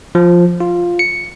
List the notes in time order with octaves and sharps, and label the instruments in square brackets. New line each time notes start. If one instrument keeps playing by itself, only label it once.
[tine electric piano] F3
F4
C#7